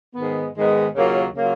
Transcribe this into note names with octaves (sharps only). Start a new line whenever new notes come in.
G#2 D#3 G#3 B3
G#2 D#3 G#3 B3
D#2 C#3 F#3 A#3 F4
C#3 F#3 A#3 F4